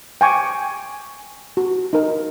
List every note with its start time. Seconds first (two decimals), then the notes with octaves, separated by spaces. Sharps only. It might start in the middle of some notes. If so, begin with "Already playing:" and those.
0.21 G5 G#5 C#6 D6
1.57 F#4
1.93 D#4 A#4